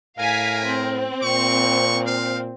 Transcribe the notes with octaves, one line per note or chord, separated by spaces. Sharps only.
A2 A#4 F5 G#5 B6
C4
A#2 C#6
F5